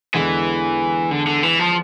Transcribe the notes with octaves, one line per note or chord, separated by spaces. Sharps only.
E2 D3 E3 G#3
D3
D3
E3
F3